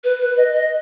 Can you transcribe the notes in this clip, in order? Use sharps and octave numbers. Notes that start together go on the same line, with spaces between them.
B4
B4
D#5
D#5